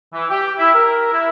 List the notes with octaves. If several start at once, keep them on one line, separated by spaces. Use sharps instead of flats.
E3
G4
E4
A#4
E4